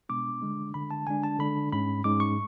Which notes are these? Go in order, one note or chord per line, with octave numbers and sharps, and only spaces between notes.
B2 G#3 B3 D4 D6
D3 G#3 D4
D3 G#3 D4 B5
A5
D3 G#3 D4 G#5
A5
D3 G#3 D4 B5
G#2 G#3 C#4 B5
G#2 G#3 C#4 D6
C#6